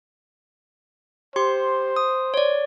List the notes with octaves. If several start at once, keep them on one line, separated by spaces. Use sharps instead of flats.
G4 C5 C6
D#6
C#5 D5